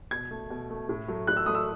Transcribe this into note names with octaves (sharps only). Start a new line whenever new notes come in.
B2 G#6
A3
B2
A3
A2
F#3 A3
A2 F#6
E6
F#3 A3 D#6
E6